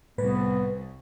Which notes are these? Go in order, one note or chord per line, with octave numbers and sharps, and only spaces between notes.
C2 A2 B3 B4